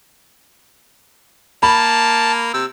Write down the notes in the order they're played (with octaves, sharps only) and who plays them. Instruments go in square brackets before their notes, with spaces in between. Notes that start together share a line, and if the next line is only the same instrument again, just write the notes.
[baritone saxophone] A#3 [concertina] A5 [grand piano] B5
[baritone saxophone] C3 [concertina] E6